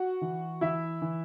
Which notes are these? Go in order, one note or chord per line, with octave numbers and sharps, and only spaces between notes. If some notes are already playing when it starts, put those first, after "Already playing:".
Already playing: F#4 F#5
E3
E3 E4 E5
E3